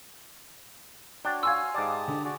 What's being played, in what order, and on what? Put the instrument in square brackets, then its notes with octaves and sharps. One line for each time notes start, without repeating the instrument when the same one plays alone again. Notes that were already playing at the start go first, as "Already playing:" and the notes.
[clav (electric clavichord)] D4 [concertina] F#4 C#5 [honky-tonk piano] G5
[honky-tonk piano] F5 G#5 C6 [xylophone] E6 G#6
[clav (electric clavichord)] G#2 D5 [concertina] G4 A5 D#6
[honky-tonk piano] D3
[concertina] F#4 G#4 D5